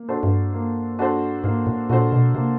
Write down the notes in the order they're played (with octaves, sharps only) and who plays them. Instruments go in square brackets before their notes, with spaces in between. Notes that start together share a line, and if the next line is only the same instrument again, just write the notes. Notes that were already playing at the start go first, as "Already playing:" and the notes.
Already playing: [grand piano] A#3
D4 F#4 A4 C5
[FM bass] G2
[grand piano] A#3
D4 F#4 A4 C5
[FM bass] G#2 [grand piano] A#3
[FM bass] A2
[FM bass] A#2 [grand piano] D4 F#4 A4 C5
[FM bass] B2
[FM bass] C3 [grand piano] A#3